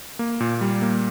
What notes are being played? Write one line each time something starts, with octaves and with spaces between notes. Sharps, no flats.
A#3
A#2
G3
A#3